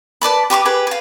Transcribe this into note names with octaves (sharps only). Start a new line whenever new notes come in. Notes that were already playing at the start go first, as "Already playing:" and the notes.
B4 D5 A5 B5
G4 B4 C#6 D6
G4 G#4 B4
B4 F5